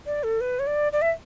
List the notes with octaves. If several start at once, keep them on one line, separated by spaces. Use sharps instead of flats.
D5
A4
B4
C#5
D5
D5
E5